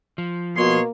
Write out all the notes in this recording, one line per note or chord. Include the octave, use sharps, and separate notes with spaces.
F3
B2 A#3 G#4 C#5 C6